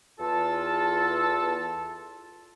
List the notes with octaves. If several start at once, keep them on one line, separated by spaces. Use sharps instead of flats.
E2 F4 A4 A5